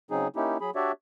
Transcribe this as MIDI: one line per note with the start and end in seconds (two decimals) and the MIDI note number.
0.11 0.28 49
0.11 0.28 54
0.11 0.28 60
0.11 0.28 63
0.11 0.28 68
0.36 0.57 58
0.36 0.57 61
0.36 0.57 63
0.36 0.57 64
0.36 0.57 67
0.61 0.70 54
0.61 0.70 68
0.61 0.70 83
0.75 0.92 62
0.75 0.92 66
0.75 0.92 67
0.75 0.92 73
0.75 0.92 74
0.75 0.92 76